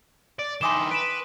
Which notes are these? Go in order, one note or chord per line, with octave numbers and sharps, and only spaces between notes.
D5
D#3 E4 G#5 C6 D6 D#6 E7 G7
B4 D7 E7